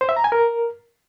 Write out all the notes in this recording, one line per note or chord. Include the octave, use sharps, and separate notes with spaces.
C5
E5
A#5
G#5
A#4